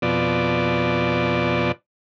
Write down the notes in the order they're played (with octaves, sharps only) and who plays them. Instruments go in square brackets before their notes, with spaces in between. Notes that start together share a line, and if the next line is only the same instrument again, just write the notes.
[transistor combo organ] F2 B2 D5